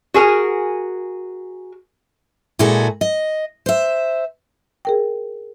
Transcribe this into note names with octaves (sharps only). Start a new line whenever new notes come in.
F#4 G#4 A#4 G#5
A#2 G#3 E4 F#4 G#4 A4
D#5
C5 E5
G#4 A#4 G5